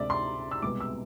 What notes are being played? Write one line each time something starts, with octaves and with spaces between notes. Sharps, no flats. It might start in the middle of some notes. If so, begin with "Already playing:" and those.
Already playing: D2 C3 G#3 D5 E5
C6
E6
C2 B2 G#3 B3 D6
E6